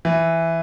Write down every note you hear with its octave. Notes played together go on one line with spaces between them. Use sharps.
E3